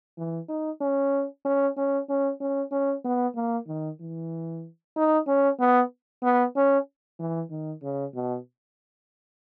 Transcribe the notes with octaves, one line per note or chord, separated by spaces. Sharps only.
E3
D#4
C#4
C#4
C#4
C#4
C#4
C#4
B3
A#3
D#3
E3
D#4
C#4
B3
B3
C#4
E3
D#3
C#3
B2